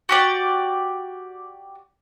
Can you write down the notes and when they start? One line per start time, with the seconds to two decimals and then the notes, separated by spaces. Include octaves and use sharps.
0.09 F#4 G4 D5